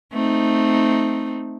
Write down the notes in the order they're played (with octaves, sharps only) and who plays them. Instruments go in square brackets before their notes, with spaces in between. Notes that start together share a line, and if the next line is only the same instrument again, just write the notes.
[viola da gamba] A3 C4 D#4